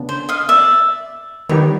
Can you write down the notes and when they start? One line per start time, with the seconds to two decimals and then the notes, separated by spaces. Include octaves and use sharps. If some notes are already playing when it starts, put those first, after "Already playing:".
Already playing: C#3 B3 D4
0.09 C5
0.29 D#5 F5
0.49 D5 E5
1.49 D#3 G3 B3 D#4 G4 C#5